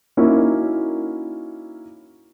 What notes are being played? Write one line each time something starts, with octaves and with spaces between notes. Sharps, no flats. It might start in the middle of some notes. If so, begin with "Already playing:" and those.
A#3 C#4 D#4 E4 F#4 A#4